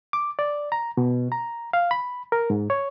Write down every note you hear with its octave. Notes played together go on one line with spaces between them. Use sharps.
D6
D5
A#5
B2
A#5
F5
B5
A#4
G#2
C#5